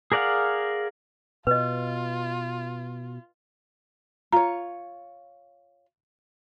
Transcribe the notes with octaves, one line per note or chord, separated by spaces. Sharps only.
G#4 A#4 D5 F5 F#5
B2 F4 B4 D#5
F4 C#5 A#5